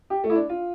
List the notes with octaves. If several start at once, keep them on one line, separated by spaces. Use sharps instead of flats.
G4
A3
E4
D4
F4